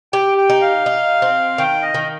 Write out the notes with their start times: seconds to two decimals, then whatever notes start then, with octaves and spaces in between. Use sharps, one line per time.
0.13 G4 G5
0.38 G5
0.50 D#4
0.61 F5
0.86 D#4
1.22 C4
1.58 D#3 G5
1.83 D#5
1.94 D#3